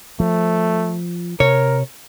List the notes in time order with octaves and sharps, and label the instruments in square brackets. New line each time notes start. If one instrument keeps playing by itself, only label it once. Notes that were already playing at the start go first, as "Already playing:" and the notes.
[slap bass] F3 [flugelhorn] A3
[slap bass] C3 [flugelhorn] A#4 [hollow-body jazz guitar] C#5